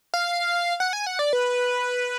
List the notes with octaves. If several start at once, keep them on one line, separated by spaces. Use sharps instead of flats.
F5
F#5
G#5
F#5
D5
B4